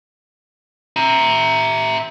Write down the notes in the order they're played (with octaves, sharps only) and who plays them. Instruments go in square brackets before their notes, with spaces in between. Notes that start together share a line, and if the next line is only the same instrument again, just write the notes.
[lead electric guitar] E5 A#5